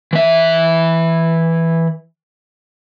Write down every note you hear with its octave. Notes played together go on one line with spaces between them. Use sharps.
E3 E5